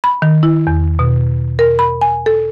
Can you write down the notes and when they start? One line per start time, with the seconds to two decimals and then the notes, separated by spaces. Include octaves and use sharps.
0.04 B5
0.22 D#3
0.43 E4
0.67 E2
0.99 B2
1.59 A#4
1.79 B5
2.01 G#5
2.26 A4